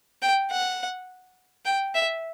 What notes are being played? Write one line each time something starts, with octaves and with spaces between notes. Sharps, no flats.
G5
F#5
G5
E5